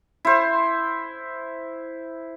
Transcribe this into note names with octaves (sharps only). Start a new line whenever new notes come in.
E4 C5